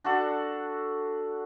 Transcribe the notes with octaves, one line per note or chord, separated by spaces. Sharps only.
D4 F#4 A4 F#5